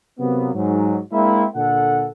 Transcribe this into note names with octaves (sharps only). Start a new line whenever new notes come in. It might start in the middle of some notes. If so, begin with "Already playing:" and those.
C3 F#3 A#3 B3
G#2 F#3
G#3 A#3 C4 D4 E4
A#2 D3 A4 F#5